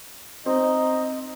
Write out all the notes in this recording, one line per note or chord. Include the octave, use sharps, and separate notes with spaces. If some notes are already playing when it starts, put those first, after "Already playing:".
C4 D#4 D#5